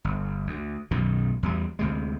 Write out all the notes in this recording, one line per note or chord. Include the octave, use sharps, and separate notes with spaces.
G1
D2
B1 F#2 B2 D#3
E2 G3
D2 C3 G#3